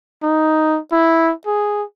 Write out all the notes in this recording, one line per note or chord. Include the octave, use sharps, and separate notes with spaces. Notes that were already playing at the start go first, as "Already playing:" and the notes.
D#4
E4
G#4